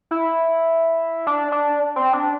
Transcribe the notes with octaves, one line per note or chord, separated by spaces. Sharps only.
E4
D4
D4
C4
D4